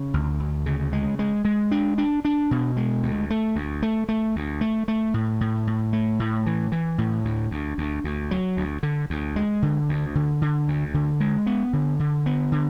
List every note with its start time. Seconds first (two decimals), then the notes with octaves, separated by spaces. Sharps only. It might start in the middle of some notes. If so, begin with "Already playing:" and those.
Already playing: C#3
0.14 D2
0.40 D2
0.66 C#3
0.93 G#3
1.19 G#3
1.45 G#3
1.71 D4
1.98 D4
2.25 D4
2.51 B2
2.77 G#3
3.03 D2
3.30 A3
3.56 D2
3.82 A3
4.09 A3
4.36 D2
4.61 A3
4.88 A3
5.14 A2
5.41 A2
5.67 A2
5.93 A3
6.20 A2
6.46 E3
6.72 E3
6.98 A2
7.25 D2
7.51 D2
7.78 D2
8.04 D2
8.31 F#3
8.57 D2
8.83 D3
9.10 D2
9.36 G#3
9.62 D3
9.89 D2
10.15 D3
10.42 D3
10.68 D2
10.94 D3
11.20 G#3
11.47 B3
11.73 D3
11.99 D3
12.26 B3
12.52 D3